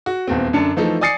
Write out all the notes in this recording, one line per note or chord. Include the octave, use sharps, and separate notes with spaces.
F#4
D#1 E2 C4
F#2 D3 D4 A5 C#7
E3 F3 A3 D#4 A4
D5 G#5 D#6 A6 C7 C#7